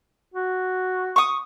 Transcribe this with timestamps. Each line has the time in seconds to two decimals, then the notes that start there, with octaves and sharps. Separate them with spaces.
0.34 F#4
1.16 C#6 D#6